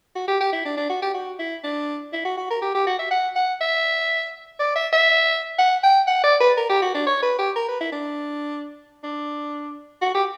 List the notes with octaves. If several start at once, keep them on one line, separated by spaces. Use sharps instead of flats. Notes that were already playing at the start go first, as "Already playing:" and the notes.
F#4
G4
G4
E4
D4
D4
F#4
G4
F#4
E4
D4
E4
F#4
F#4
A#4
G4
G4
F#4
E5
F#5
F#5
E5
D5
E5
E5
F#5
G5
F#5
D5
B4
A#4
G4
F#4
D4
C#5
B4
G4
A#4
B4
E4
D4
D4
F#4
G4